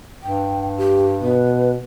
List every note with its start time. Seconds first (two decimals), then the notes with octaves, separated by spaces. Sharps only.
0.23 G2 G5
0.78 G4
1.23 B2 B4